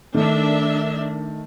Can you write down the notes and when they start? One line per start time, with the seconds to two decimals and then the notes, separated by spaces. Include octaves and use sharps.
0.14 D#3 A3 D4 A#4 E5